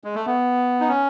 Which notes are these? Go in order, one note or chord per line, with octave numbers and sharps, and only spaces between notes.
G#3
A3
B3
D#4
C#4